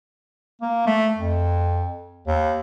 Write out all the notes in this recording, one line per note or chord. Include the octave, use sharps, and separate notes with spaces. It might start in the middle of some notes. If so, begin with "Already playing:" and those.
A#3
A3
F2
D#2